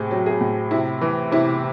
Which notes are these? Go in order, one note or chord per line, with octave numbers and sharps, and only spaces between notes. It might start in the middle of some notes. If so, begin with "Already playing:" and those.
Already playing: A2 C3 G#4
F#3
G#4
A2
C3 E4
E3
C3 E4